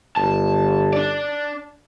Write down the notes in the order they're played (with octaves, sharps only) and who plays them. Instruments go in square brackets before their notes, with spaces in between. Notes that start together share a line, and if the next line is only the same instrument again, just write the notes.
[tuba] G1 [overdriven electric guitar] A5
[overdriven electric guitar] D4 D5